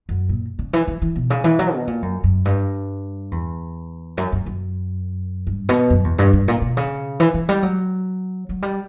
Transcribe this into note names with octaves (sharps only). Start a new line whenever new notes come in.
F#2
A#2
C#3
E3
E3
E3
B2
C#3
E3
F#3
B2
A#2
F#2
F#2
G2
E2
F#2
F#2
F#2
G2
B2
F#2
E2
G2
G2
A#2
B2
C#3
E3
E3
G3
F#3
F#3
G3